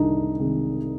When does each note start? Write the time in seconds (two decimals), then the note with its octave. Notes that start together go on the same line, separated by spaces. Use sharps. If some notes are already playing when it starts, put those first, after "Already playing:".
Already playing: C2 C3 D#3 G#3 D4 D#4
0.39 C3 D#3 G#3